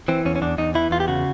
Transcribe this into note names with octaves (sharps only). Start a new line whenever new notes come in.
E3 C4
E2 C#4
C#4
E2 D4
E2 D#4
E3 E4
E2 F4
G4
C#3 F#4